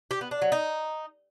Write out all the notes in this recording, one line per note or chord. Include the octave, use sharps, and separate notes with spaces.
G4
B3
D4
F#3
D#4